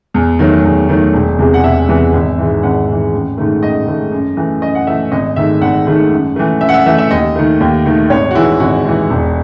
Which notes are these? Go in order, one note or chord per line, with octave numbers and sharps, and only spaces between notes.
E2
D#3 F#3 A3
E2
D#3 F#3 A3
E1
E2 C3 E3 G#3
F#5
E1 E5
E2 C3 E3 G#3
G#1
G#2 E3
G#1 F#5
G#2 E3
A1
G#2 D#3 A3
A1 D#5
G#2 D#3 A3
F#2
E3 A3
F#2 D#5
F#5
E3 A3 E5
G#1 D#5
G#2 D#3 A3 E5
G#1 F#5
G#2 D#3 A3
F#2
E3 A3
F#2 E5
F#5
E5
E3 A3 E5
E5
D#2 D#5
D#3 A3
D#2
D#3 A3
G#1 C#5
F#4
G#2 E3 E4
G#1 F#4
G#2 E3
E1